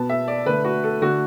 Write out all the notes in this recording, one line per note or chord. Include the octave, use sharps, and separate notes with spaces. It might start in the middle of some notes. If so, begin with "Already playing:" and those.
Already playing: B2 B3 A5
E5
D5
D3 A3 B4
F#4
A4
D3 A3 F#4